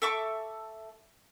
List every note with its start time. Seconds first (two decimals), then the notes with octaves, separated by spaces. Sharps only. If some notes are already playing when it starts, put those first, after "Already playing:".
0.02 A4 E5 C#6 D6